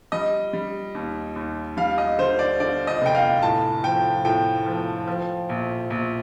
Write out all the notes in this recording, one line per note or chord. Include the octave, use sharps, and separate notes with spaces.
G3 D#5
G3
D#2
D#2
G3 F5
D#5
D3 C5
D5
D3 D5
D#5
F1 G5
F5
A2 A5
F3 G5
A2 G5
F3
F3
A#1
A#1